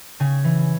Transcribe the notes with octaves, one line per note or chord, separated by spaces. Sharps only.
C#3 G#5
E3